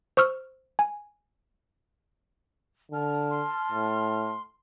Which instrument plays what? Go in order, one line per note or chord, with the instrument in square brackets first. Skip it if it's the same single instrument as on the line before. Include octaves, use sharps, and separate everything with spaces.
[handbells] C5 C#6 E6 F6
G#5
[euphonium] D3 [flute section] A5 F6
[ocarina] C6
[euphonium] A2